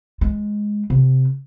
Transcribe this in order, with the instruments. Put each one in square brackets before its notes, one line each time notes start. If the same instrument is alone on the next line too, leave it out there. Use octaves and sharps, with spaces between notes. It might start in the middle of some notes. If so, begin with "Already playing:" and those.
[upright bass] G#3
C3